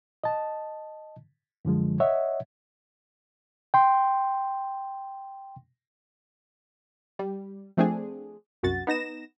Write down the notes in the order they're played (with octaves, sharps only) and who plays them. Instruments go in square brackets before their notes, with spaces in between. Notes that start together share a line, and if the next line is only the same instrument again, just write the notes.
[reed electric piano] D#5 A5
F#2 D3 F3 G#3
C#5 D#5 E5 F#5
G5 C6
[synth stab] G3
F3 A3 C4 D4 G#4
C2 F#2 F#4 A6
B3 D#4 A#6 E7